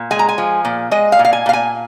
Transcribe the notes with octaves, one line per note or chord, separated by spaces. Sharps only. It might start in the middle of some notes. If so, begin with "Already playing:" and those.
Already playing: A#2
G#3 G#5
A#5
G#5
F3
A#2
G#3 D#5
F5
A#2
F5
G#5
A#2 F5
G#5